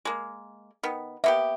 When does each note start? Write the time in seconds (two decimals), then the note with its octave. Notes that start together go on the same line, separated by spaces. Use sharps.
0.05 G#3 A#3
0.83 D#3 B3
1.24 A#3 B3 G4 E5